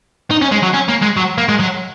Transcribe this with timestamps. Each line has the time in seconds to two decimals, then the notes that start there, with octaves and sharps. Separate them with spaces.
0.30 D#4
0.42 C#4
0.52 G#3
0.63 F#3
0.74 C#4
0.88 A#3
1.02 G#3
1.17 F#3
1.38 A#3
1.49 G#3
1.60 F#3